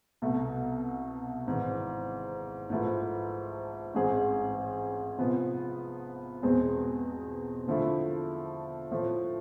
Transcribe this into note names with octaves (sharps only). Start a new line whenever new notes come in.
C2 B2 A3
G#1 G#2 E3
G#2 F3 A3 E4 B4
A1 G#2 G#3 C4 G#4
C3 F3 B3
E2 B2 G#3 C4 G#4
D3 F3 A3 E4
A2 F3 A3